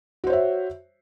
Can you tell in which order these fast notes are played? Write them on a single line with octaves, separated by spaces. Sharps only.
F#4 C5 C#5 E5